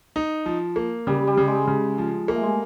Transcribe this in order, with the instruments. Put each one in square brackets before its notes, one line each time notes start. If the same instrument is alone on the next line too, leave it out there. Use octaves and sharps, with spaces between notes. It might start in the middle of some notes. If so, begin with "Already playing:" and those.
[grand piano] D#4
F3
A#3
[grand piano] C#3 [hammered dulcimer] G3
[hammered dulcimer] G3
[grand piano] C#3
[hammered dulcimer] G#3
[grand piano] C#3
F3
[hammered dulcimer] G#3 [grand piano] A#3
[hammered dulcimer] A3
G#3